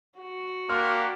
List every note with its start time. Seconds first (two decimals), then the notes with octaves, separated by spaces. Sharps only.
0.19 F#4
0.69 A#3 D4 G4 F#5 C6 F6